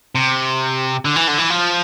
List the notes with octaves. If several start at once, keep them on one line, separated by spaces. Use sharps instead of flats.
C3
D3
E3
D3
E3
F3